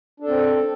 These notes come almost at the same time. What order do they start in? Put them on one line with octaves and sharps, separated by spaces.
D4 A4 C4